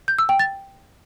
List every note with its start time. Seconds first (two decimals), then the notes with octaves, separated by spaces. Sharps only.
0.08 G6
0.18 E6
0.29 G5
0.39 A6